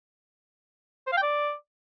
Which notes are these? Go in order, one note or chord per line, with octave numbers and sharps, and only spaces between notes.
C5
F5
G5
D5